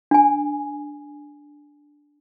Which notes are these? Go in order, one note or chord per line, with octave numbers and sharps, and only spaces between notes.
D4 G#5